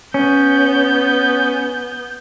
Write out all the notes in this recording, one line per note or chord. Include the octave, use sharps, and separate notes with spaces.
B3 C#4 G6